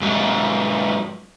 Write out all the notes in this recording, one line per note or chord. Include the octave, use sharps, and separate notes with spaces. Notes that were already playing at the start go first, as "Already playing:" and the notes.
G#2 F#3